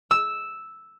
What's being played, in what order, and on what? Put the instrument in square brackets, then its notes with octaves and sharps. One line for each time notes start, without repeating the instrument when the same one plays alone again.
[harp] E6